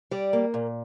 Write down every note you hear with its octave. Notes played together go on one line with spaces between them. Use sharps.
G3 D5
A#3
A#2